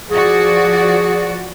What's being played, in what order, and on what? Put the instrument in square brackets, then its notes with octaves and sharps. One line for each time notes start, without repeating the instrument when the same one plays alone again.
[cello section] F3 F#4 D5 [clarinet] G#4